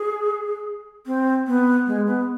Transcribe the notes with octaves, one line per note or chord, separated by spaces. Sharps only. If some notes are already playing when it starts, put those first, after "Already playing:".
Already playing: G#4
C4
B3
G#3
B3